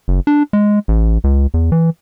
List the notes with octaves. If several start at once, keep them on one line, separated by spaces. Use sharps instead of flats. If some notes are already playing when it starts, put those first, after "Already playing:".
F#1
D4
G#3
A1
C#2
E2
E3